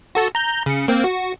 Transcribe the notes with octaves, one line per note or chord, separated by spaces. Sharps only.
F#4 A4 A5
A#5 G6
C#3 C#7
A#3 C4
F#4